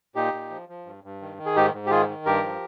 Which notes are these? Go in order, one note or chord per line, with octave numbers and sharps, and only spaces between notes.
A#2 D#4 G4
A#2
F3
F3
G2
G2
D#3
D#3
G#4
G#2 D#4 G4
G#2
G4
D#3 F4 G#4
D#3
G2 G4 A#4
F3